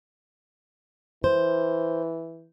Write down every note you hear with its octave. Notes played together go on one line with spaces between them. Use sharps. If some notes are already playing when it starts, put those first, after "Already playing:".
E3 C5